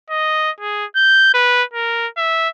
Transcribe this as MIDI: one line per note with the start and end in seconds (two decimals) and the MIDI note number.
0.10 0.51 75
0.60 0.85 68
0.96 1.32 91
1.34 1.63 71
1.74 2.08 70
2.18 2.49 76